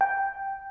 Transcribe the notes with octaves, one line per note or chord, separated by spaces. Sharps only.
G5